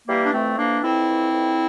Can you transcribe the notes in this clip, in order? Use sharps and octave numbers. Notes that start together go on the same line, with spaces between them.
E3 G3 A#3
D4
F2 A3 C4
E3 A#3 D4
F2 C4 E4
E3
F2